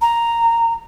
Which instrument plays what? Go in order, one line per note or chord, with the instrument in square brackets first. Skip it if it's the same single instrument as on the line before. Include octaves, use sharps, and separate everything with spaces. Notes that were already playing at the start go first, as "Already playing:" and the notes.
[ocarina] A#5